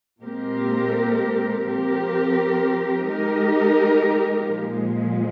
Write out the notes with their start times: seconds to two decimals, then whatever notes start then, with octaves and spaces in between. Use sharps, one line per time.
0.22 A#2 G#3 C4 G4 A#4
1.65 F3 C4 G4 A#4
3.06 G#3 D#4 G4 A#4
4.48 A#2 F3 G#3